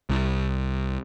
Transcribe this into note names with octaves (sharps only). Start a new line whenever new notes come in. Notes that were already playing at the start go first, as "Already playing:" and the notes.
C2